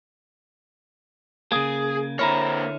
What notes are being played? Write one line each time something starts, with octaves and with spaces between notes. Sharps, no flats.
C#3 A#3 G#4 D#6 G#6
D3 A#3 C4 E4 C#5 A#5 B5 F6